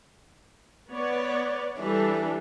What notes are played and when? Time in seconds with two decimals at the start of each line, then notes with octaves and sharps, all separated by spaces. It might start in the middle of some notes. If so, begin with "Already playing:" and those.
0.90 B3 C#5 D5
1.80 E3 G3 D4 A4